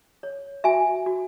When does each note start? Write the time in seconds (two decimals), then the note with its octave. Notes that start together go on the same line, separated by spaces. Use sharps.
0.23 C#5
0.64 F#4 E5 G#5
1.06 F#4